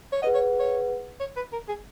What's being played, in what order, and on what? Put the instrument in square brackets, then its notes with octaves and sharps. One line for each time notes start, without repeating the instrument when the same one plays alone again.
[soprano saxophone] C#5
[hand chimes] G#4 B4 F#5 [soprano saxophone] D#5
[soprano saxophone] C#5
C#5
C#5
B4
A#4
G#4